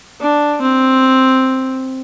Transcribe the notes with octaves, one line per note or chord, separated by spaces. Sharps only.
D4
C4